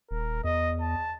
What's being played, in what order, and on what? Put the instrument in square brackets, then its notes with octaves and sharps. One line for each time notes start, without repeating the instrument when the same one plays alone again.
[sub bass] D#1 [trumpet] A#4
[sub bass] E2 [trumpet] D#5
[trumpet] A5